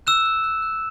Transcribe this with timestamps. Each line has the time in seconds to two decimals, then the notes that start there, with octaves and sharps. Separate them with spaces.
0.07 E6 F#6 E7
0.25 F#6
0.44 F#6
0.62 F#6